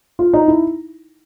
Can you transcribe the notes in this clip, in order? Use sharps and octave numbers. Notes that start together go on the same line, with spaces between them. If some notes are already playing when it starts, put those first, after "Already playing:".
F4
D#4
E4